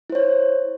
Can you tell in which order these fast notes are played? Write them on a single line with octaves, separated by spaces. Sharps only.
E4 C5 C#5